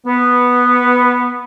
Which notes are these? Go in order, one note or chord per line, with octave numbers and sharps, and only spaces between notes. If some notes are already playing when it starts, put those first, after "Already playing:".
B3